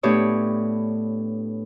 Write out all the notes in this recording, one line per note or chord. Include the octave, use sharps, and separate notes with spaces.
A2 B3 D4 G4 C#5 D#6